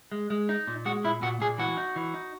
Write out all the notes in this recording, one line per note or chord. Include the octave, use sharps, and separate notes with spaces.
G#3
G#3
D#4
A#2
G#3 F#4
A#2 E4
A#2 F#4
A#2 G#4
E3 F#4
D#4
E3
D#4